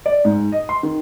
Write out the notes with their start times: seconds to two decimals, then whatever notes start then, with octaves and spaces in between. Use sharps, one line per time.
0.06 D5
0.25 G#2
0.52 D#5
0.69 C6
0.83 D#3